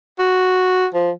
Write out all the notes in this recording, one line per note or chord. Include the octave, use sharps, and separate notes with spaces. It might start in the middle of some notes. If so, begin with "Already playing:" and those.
F#4
F3